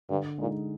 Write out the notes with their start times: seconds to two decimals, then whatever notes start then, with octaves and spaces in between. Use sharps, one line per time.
0.10 G2 D3
0.38 A#2 G#3 D#4